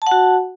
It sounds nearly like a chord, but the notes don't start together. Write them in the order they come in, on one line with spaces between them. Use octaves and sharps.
A5 F#5 F#4